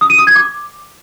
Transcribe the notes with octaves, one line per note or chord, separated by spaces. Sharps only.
D#6
D#7
D#6
G#6
D6